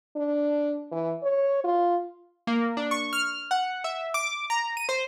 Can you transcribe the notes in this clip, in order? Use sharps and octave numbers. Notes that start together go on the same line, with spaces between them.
D4
E3
C#5
F4
A#3
D4
C#6
F6
F#5
E5
D6
A#5
D#7
C5